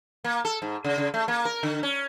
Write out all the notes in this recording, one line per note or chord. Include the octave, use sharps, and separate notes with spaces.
A#3
A4
G#2
C#3
C#3
A3
A#3
A#4
D3
C#4